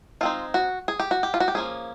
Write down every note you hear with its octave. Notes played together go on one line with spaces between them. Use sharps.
G#3 C4 D#4 F4
F#4
G#4
G4
F#4
G4
F4
F#4
G4
F3 A#3 C#4 G#4